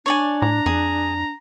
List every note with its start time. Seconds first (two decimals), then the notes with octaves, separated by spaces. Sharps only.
0.06 D4 C#5 D5 G#5
0.42 A2 A#5
0.66 F2 G#4